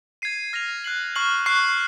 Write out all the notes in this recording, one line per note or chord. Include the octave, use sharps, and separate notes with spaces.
G#6 C7 D#7
F6 A#6 F7
F#6 C7 F#7
C#6 F6 C7 F#7
C#6 F#6 C7